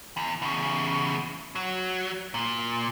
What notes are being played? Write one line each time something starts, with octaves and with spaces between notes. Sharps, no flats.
E2
E2 C#3
F#3
A#2